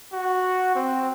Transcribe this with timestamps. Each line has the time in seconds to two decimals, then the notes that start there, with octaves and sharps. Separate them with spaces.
0.13 F#4
0.75 C4